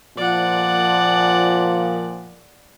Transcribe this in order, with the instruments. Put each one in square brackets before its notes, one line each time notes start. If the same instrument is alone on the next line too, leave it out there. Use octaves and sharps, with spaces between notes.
[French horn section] A#2 F3 [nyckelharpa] D5 F#5